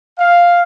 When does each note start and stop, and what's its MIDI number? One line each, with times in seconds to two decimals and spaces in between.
0.19 0.62 77